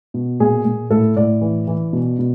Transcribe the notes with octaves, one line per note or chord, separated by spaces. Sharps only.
B2
A#2 G#4
A#2
A2 A4
A2 D5
E3
E3
B2
B2